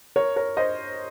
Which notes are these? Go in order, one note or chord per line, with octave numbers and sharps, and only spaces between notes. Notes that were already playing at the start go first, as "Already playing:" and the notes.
A#4 C#5
A#4 C#5
C5 D#5